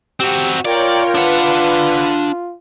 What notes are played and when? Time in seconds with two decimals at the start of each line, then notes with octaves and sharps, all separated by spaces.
0.20 C4 F#4 G4
0.65 F4 A#4 C#5 D5 G5
1.15 D4 B4 F#5